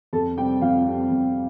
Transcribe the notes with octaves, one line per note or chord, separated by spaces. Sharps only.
F2 A4 A5
C3 G3 C4 G4 G5
F2 F4 F5
C3 G3 C4
F2